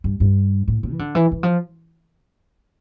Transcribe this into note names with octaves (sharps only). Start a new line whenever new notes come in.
G2
G2
A2
A#2
E3
D3
E3
E3
F3